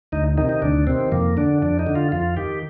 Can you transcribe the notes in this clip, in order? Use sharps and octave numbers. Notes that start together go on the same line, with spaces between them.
D2 D#4
C3 D#3 D#4
D#4
D2 D4
C3 D#3 C4
F2 A#3
D3 D4
F2 D4
D#4
D3
F4
F2 F4
D#3 G4